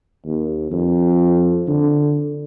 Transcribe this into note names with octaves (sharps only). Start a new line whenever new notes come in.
D#2
F2
D3